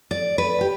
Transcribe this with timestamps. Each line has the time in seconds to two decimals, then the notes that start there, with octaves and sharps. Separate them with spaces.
0.11 D5
0.38 B4
0.61 G4